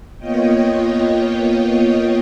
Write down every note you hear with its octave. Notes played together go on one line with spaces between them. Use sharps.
A#3 B3 F4 C#5 D#5 G5